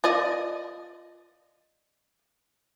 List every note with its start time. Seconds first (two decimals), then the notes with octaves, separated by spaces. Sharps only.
0.04 F4 D5 D#5